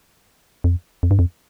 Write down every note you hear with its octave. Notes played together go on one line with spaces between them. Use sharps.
F2
F2
G2
F2